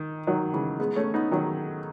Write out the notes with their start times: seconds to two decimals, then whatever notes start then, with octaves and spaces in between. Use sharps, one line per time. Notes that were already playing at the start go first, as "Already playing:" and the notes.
Already playing: D#3
0.27 D#3 F#3
0.53 C#3 E3
0.80 G#3 B3
0.96 A3 C#4
1.14 B3 D#4
1.31 D#3 F#3